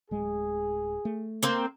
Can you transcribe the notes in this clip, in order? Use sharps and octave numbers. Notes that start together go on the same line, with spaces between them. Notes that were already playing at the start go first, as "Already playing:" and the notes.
D1 G#3 G#4
A3
A#3 C4